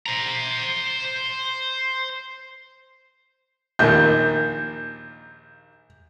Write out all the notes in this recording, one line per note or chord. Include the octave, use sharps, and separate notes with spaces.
C5 A#5
A#1 D#2 D#3 G6